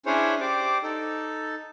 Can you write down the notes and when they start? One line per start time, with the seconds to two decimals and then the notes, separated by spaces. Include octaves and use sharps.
0.06 C#4 D4 E4 G#4 C5 C#5
0.41 G4 C5 D5 D6
0.83 D#4 A4